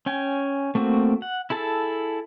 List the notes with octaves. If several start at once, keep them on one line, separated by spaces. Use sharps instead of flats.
C#4 G5 G#5
A3 A#3 C4 F#4
F#5
E4 G#4 A4 A5